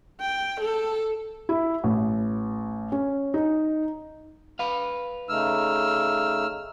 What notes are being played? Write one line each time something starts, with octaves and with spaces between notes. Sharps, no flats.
G5
A4
E4
A1
C#4
D#4
B4 F5
C#3 A3 D#4 E6 F6